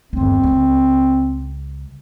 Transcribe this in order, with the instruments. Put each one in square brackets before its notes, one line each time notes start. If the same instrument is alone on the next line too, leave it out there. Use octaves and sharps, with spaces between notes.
[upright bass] G1 D#2 [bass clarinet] C4
[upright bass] C#2